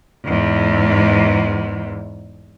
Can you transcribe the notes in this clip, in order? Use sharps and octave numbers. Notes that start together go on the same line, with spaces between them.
E2 G#2